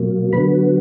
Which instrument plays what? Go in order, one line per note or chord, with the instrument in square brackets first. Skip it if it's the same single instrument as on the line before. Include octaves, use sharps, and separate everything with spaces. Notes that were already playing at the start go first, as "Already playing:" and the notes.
Already playing: [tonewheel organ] B2 F#3 A#3
D3 F#3 B3 B4 B5